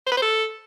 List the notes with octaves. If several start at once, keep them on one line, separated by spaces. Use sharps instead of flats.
C5
B4
C5
A4